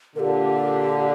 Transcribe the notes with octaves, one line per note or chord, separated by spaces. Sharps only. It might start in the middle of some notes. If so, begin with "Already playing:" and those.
A#2 D3 G4 A#4